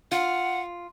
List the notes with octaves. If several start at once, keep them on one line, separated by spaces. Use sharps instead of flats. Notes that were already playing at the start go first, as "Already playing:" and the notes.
F4 F#5